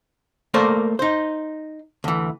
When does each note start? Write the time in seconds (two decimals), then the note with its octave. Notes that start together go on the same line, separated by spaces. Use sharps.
0.54 A3 A#3 A#4 C5 D5
0.99 D#4 C5
2.04 D2 E3